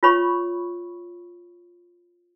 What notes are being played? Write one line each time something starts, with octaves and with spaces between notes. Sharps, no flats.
F4 C#5 B5 C#6